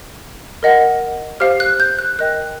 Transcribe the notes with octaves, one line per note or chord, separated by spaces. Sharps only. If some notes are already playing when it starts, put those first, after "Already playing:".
A#4 D#5 F#5
G4 C5 F5 F6
F#6
G6
F#6
A#4 D#5 G5 F#6